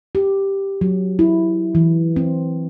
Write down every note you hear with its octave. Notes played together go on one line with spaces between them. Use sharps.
G4
F#3
E4
E3
C4